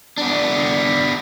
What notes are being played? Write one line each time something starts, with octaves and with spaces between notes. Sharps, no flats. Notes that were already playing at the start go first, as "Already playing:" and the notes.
B3 D4